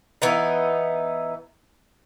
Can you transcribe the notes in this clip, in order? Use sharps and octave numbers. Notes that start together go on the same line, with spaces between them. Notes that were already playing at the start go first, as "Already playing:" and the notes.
E3 B3 D#4